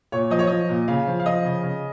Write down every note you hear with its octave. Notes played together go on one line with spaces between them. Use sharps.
A#2 C#5
F3 D#5
C#5
F3 D#5
A#2
C#3 F5
F3
F5
F3 D#5
C#3
C#3